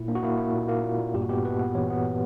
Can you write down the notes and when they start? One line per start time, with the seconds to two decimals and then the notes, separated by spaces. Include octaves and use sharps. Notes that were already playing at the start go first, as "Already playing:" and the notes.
Already playing: A#2 E4
0.08 A#3 D4
0.15 F#4
0.23 A#3 E4
0.37 A#3 E4
0.53 A#2
0.68 A#3
0.83 A#2
0.99 A#2
1.14 G2 G4
1.22 F#4
1.29 B3 G4
1.44 B3 B4
1.59 B3
1.75 E3 C#5
1.90 B3
2.06 B3